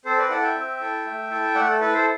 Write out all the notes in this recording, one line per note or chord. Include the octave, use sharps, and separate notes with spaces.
C4 A4 C5
B4 D5
E4 A4 D5 F#5
E5 G5
C4
E4 A4
A3
E4 A4
A3 D5 F#5
A4
E4 A4 B4
A4 C5